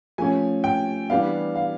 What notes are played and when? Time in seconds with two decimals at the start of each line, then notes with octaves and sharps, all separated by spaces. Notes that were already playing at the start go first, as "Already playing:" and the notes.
0.18 F3 A3 C#4 G#5
0.64 G5
1.10 E3 G3 B3 D4 F5
1.55 F5